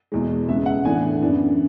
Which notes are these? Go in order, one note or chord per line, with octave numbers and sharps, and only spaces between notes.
E2 B2 G#3
C#3 G#3 B3 E5
F#5
A2 E3 B3 D4 G#5
F#2 E3 B3 D4